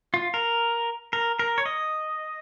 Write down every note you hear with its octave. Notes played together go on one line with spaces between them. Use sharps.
F4
A#4
A#4
A#4
C#5
D#5